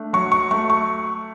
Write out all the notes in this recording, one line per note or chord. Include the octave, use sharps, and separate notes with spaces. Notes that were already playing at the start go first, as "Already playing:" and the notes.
Already playing: A3 D4
F#3 C#6
C#6
A3 C#6
C#6